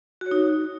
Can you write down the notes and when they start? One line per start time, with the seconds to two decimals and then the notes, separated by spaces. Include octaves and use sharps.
0.21 F#4
0.26 C#5
0.31 D#4